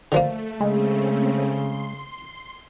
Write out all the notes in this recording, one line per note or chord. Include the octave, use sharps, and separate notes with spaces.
D3 F3 A3 A#3
C#3 G#3 A3 C4 C#4
C6